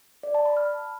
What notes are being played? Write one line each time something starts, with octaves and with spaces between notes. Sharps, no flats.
D5
A5
B5
F6